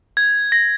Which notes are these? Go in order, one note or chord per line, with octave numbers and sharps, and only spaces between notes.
G#6
A#6